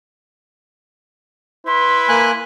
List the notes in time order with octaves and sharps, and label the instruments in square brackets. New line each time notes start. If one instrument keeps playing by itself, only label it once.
[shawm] E4 [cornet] B4 [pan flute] C6
[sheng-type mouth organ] A#3 G#5 F#6